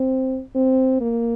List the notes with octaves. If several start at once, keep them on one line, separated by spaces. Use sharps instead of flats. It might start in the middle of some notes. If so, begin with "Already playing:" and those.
Already playing: C4
C4
A#3